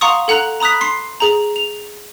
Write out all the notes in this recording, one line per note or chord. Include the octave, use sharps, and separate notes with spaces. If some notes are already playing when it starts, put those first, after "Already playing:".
F5 F#5 A#5 C6 C#6 D#6
A4 F#5 A#5 F#6 F#7
A#5 B5 D#6 F#6 B6
C6 C7
G#4 A#5
F7